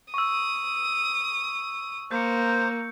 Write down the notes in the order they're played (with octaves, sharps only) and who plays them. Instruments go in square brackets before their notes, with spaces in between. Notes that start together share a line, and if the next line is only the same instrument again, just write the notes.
[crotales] C#6 E6 [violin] D#6
[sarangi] A#3 [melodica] C5 [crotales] G6 C#7